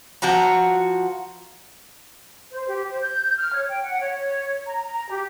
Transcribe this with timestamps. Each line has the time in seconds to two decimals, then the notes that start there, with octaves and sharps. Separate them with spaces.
0.22 F3 F#4 F#5 A#5
2.52 C5
2.68 G4
2.88 C5
3.02 G6
3.38 F6
3.54 C#5
3.69 G5
3.83 F#5
4.00 C#5
4.67 A#5
4.88 A#5
5.11 G4